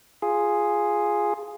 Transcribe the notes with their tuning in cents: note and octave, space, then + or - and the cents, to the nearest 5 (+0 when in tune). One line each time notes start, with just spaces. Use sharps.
F4 +0 G#4 +0